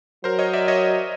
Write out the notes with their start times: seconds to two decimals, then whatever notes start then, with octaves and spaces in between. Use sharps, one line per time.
0.24 F#3 A#4 C5
0.39 C#5 D#5
0.53 D5 E5
0.68 C#5 D#5